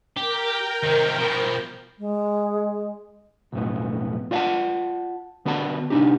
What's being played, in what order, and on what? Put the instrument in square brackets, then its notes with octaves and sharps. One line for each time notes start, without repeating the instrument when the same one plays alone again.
[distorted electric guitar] G4 [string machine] A#4 G5
[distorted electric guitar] C3 D#3
B2 F3
[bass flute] G#3
[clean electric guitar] B1 F2 A2 B3
F4 D5 D#5 F5 F#5 A5
D3 B3 F#4 D5 A5
C3 D4 D#4 G4